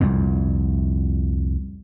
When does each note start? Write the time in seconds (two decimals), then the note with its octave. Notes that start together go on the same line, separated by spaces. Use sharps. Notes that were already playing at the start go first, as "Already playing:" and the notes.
0.01 C2 F2 A#2